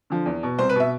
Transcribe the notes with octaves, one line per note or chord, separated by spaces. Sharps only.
D3 F3
E2
B2
C2 C5
B4
B2 E5